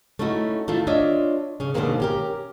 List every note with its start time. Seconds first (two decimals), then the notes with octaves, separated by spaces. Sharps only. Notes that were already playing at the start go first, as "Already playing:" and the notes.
0.19 A3 C#4 D#4 E4 F#4
0.68 D#3 A3 E4 F4
0.87 D4 F4 C#5 D#5 E5
1.60 C#3 C#4
1.74 B2 D3 D#3 G#3 A#3 C4
2.00 C#4 G4 A#4